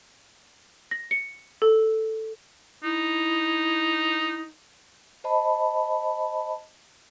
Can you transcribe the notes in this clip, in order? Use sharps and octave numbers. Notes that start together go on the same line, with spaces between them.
A#6
C#7
A4
D#4 E4
C5 D#5 A5 B5